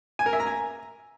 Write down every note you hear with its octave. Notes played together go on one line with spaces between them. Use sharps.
G#5
A#4
E5
A#5
G#5